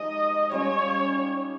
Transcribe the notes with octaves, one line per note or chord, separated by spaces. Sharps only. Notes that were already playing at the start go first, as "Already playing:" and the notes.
Already playing: F3 G#3 D#4 G4 D#5
G3 C#4 F4 C#5